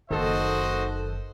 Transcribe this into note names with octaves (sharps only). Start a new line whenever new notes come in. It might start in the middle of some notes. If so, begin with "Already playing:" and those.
F#1 D#3 A#3 F#4 A4 C5 D#5